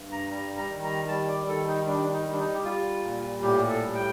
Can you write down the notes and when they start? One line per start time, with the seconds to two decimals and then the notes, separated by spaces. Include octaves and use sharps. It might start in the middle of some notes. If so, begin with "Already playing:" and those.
Already playing: G2
0.12 A#5
0.31 G3 A#5
0.57 A#5
0.69 D#3
0.83 A#5
1.08 G3 A5
1.28 D5
1.48 D#3 A4
1.67 D#4
1.87 G3 D4
2.13 D#4
2.26 G3
2.33 D4
2.39 D#4
2.54 G4
2.65 G3 F4
3.04 A#2
3.42 A2 G4
3.68 A4
3.82 G3
3.95 G5